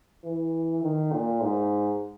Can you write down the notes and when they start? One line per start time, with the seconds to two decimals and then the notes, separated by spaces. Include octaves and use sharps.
0.24 E3
0.83 D#3
1.12 A#2
1.41 G#2